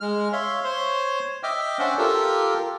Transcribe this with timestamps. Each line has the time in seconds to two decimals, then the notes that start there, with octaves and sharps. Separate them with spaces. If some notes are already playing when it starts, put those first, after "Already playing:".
0.01 G#3 F6
0.32 C#5 E5 F5 C6
0.64 C5 C#5 C6
1.43 D#5 E5 G5 D6 F6
1.79 C#4 D4 C5 D5 E5 F#5
1.98 F4 G4 A4 A#4